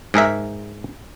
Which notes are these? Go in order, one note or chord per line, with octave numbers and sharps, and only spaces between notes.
G#2 G#4 A#4 E5